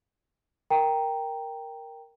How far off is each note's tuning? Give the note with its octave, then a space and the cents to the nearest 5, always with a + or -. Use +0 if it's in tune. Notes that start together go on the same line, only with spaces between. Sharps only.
A#4 +0 G5 +0 A#5 +0